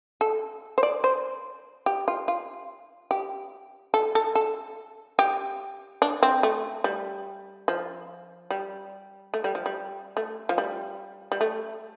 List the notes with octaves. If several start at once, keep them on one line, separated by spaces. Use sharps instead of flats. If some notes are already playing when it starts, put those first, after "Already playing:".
A4
C5
D5
C5
G4
F4
F4
G4
A4
A4
A4
G4
D4
C4
A3
G3
F3
G3
A3
G3
F3
G3
A3
F3
G3
G3
A3